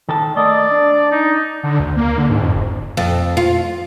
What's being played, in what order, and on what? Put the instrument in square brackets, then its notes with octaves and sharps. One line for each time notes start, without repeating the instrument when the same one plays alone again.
[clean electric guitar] D#3 A4 A5
[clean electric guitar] A3 A#4 D#5 [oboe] D5
[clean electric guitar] D4
[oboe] D#4
[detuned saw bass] D3
D2
A#3
D3
G#2
F2
F#1
[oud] F2
F4